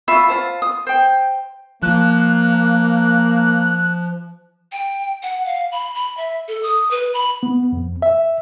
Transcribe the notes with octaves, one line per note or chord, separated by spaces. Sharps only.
F4 E5 B5 C#6
F4 C5 A5
D#6
C5 G5
F3 A#3 F#6
G5
F#5
F5
B5
B5
E5
A4
D#6
B4
B5
B3
F2
E5